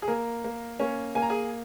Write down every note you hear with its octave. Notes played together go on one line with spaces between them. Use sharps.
G#4
A#3 A#4
A#3
A#3 C#4 C#5
A#3 G#5
A#5
G#4 G#5